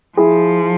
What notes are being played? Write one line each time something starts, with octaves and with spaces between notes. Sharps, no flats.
F3 E4 G#4